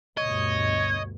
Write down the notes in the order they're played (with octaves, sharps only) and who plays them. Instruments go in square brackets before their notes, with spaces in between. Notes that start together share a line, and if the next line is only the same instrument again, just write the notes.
[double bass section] D2 G2 B2 [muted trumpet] C#5 [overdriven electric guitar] D#5